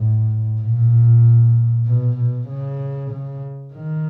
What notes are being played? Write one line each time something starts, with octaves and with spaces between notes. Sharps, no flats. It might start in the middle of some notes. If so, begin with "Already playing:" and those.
Already playing: A2
A#2
B2
B2
C#3
C#3
D#3